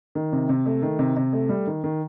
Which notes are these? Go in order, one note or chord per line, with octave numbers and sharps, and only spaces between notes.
D#3
C3
C3
A3
D#3
C3
C3
A3
G3
D#3
D#3